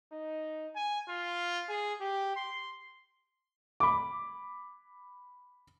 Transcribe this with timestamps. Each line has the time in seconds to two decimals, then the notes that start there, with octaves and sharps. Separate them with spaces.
0.13 D#4
0.75 G#5
1.09 F4
1.69 G#4
2.00 G4
2.36 C6
3.80 B5 D6